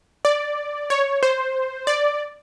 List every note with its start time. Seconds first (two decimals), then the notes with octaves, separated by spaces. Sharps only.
0.25 D5
0.90 C#5
1.23 C5
1.87 D5